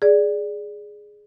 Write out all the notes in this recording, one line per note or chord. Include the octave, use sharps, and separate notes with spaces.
G#4 D5